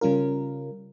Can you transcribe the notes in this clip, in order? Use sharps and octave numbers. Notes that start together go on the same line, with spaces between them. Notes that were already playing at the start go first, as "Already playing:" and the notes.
C#3 G3 C#4 F4 A#4